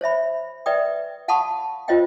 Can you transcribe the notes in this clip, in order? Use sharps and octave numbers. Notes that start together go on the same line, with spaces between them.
C5 C#5 E5 B5
B4 D5 E5 G5 D#6
F5 F#5 A5 B5 C#6 D#6
F4 C5 C#5 D#5 F5 G5